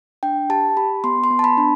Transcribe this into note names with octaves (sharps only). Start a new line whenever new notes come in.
D4 G5
G4 A5
G4 B5
B3 C6
C6
B3
A5
B5
D4